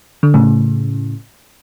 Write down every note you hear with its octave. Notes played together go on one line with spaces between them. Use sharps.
D3
A2 C#3